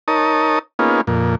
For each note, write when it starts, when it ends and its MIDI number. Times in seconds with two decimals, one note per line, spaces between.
0.08 0.59 63
0.08 0.59 70
0.08 0.59 73
0.08 0.59 81
0.08 0.59 87
0.79 1.01 58
0.79 1.01 59
0.79 1.01 61
0.79 1.01 63
0.79 1.01 65
0.79 1.01 68
1.07 1.35 41
1.07 1.35 46